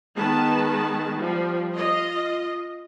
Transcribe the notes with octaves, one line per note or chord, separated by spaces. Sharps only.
D#3 G#3 B3 B4 A5
F3 G3
F4 D#5